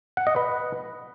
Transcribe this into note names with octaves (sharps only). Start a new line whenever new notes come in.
F#5
D#5
B4